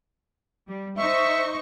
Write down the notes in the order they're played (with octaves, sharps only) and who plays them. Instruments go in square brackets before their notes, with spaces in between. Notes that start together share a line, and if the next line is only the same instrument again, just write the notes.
[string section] G3
[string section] D#4 C5 C#6 [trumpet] E5